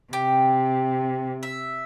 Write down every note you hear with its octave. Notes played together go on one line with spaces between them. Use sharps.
C3 G4
E5